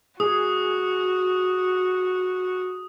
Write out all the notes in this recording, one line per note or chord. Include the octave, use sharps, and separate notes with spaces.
F#4 G#4 D#6